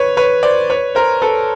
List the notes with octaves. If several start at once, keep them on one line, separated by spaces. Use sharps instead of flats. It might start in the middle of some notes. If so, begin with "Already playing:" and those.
Already playing: B4 C#5
B4 C#5
C5 D5
B4 C#5
A#4 C5
A4 B4